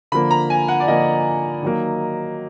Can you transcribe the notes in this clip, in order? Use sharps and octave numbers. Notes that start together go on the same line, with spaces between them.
D3 F3 A#3 B5
A#5
G#5
F#5
D5
D3 F3 A#3 D#5
D#3 F#3 A#3